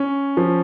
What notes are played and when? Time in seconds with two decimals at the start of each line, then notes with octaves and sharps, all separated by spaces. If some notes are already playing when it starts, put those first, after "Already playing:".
Already playing: C#4
0.37 F3